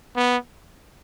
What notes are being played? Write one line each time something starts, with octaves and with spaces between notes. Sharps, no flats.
B3